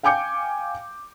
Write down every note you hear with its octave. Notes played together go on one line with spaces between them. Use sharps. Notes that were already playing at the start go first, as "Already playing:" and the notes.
F5 G5 G#5 D6 G6 C#7